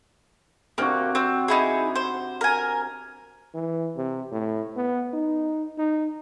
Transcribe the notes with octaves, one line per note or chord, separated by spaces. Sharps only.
C3 A#3 D4 F#4
C4
D#4 E4 G#4
C5
A#4 G#5
E3
C3
A2
B3
D#4
D#4